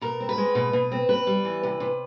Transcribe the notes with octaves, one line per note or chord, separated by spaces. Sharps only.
B2 A#4
C4
B4
G#3
B2
B2
C4
C3 B4
G3
E3
C3
C3